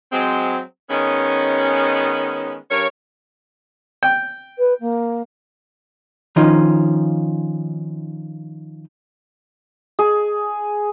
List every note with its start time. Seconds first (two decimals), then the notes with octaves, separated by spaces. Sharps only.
0.12 F#3 G#3 C4
0.90 D#3 G#3 B3 C#4
2.70 G2 A#4 C#5
4.03 G5
4.58 B4
4.80 A#3
6.36 D#3 F3 C#4 D#4 F4
9.99 G#4